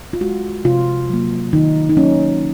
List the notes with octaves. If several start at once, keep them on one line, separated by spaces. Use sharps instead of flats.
F4
G#3 F#4
C3 F4
F#3 A#3
D#3 D#4
D#4
F#3 A#3 C#4